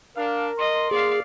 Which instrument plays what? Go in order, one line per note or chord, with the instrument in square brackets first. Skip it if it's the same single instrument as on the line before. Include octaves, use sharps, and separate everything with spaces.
[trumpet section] D4 F5 [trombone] A#4
[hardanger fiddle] D#5 [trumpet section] C6
[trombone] A#3 [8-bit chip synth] G#4 [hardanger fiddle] D5 F5